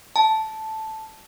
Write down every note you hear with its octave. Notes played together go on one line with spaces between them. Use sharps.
A5